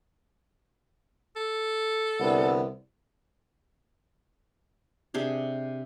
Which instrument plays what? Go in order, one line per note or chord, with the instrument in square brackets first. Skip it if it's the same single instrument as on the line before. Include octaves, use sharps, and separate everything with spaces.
[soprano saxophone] A4
[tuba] C2 [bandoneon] D3 B3
[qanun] C3 D4 G4 G#4